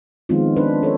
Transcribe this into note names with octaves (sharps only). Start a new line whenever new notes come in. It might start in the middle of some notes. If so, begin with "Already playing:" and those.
D#3 F3 G#3 B3 C4 F4
D4 B4 C5
C#4 A4 A#4 C5 C#5